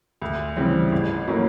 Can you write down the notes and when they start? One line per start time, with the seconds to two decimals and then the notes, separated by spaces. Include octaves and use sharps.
0.22 D2
0.56 C#3 E3 G3 C4
0.92 A1
1.27 A2 F#3 A#3 C#4